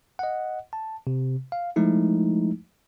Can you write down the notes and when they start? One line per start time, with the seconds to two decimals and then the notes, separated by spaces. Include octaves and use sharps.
0.19 D#5 F#5
0.73 A5
1.07 C3
1.52 F5
1.76 F3 G#3 A3 D#4 E4